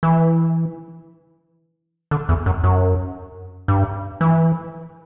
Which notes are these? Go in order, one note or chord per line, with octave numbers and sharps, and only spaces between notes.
E3
D3
E2
F#2
F#2
G2
E3